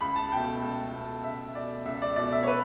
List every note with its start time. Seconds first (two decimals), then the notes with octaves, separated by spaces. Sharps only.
0.01 C#2 B5
0.16 A5
0.32 B2 A3 G5
0.62 C#2
0.93 B2 A3
1.24 C#2 E5
1.55 B2 A3 D5
1.85 C#2 E5
2.02 D5
2.16 B2 A3 D5
2.32 E5
2.43 C#5
2.47 B4